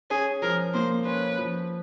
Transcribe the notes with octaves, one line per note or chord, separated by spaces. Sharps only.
C#4 G#4
F3 A#4
A#3 C5
C#4 B4
F3